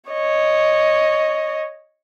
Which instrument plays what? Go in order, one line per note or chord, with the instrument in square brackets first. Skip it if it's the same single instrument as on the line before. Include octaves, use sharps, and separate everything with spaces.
[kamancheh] C#5 D#5